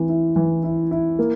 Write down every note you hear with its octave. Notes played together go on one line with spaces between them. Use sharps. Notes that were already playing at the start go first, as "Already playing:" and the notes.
Already playing: E3 C4
E4
E3
E4
E4
A#3